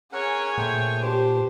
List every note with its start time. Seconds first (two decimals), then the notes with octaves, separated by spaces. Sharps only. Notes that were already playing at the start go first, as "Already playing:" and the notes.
0.12 C#4 G#4 A#4 C#5 F#5
0.58 A#2 A3 C5 G5
1.01 D4 G4 C5